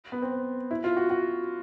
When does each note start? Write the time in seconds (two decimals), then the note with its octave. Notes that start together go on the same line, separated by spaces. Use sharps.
0.12 B3
0.22 C4
0.71 E4
0.84 F4
0.97 F#4
1.10 F#4